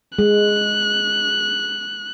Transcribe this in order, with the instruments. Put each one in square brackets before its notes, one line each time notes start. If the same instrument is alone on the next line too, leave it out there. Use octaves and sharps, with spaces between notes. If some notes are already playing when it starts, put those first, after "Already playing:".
[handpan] G#3 [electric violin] F#6